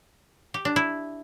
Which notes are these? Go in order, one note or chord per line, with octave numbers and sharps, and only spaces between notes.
G4
D4
E4